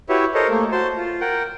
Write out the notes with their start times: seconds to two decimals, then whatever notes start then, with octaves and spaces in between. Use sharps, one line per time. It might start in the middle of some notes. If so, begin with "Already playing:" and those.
0.09 E4 F#4 G4 B4 C#5 E5
0.34 A4 A#4 C5 C#5 D#5
0.50 A3 A#3
0.72 F#4 C5 A5 C6
0.97 F4
1.21 A#4 F#5 G5